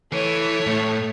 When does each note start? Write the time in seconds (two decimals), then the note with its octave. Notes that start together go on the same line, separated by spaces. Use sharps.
0.12 E3 A3 C#5
0.67 A2